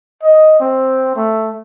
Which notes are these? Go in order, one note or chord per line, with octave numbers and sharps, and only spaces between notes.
D#5
C4
A3